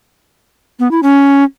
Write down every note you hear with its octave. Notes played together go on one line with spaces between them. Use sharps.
B3
E4
C#4